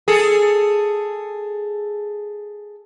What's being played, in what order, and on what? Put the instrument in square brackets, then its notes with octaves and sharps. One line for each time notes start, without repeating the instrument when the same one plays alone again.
[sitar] G#4 A4